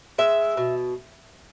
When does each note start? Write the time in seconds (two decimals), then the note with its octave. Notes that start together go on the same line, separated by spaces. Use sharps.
0.18 G#3 E5
0.57 B2